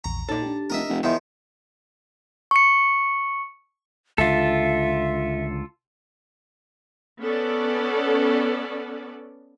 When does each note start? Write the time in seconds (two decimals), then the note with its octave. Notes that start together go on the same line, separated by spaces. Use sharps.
0.04 A#1 E2 A#5 C#6
0.29 A#2 D#4 A4 C#5 D5
0.42 D4 G4
0.70 F1 A#4 D#5 E5
0.89 F1
1.03 E2 D#3 F3 E5
2.51 C#6 C#7
4.18 C#2 D3 F4 A4 E5
7.21 B3 C#4 A4 D5